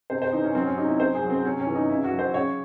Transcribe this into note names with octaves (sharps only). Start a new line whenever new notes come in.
C3 C5
C5
E3 D#4
C#4
F#3 C4
C#4
C3 D#4
E4
C3 C5
G#4
F#3
C4
C3 C#4
C#4
E3
D#4
C#3 E4
F#4
F#3
C5
C#3 C#5